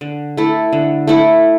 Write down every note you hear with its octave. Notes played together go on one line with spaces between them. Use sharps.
D3
A3 E4 A4
D3
A3 E4 A4